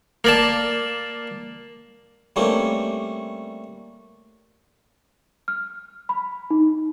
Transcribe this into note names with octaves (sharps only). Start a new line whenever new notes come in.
A#3 D5 A5
G3 A3 A#3 C4 C#4
F6
B5
D#4